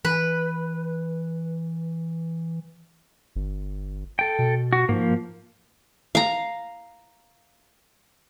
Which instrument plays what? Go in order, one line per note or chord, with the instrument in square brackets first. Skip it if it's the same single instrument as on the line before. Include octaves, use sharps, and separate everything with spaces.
[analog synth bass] E3 [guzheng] B4
[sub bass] G1
[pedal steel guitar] A4 G5
[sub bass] B2
[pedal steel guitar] F#4
[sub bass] G#2 [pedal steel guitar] F3 A#3
[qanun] F5 A#5